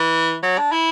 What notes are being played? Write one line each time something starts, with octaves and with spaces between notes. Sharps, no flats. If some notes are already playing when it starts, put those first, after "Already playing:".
Already playing: E3
F#3
D4
E4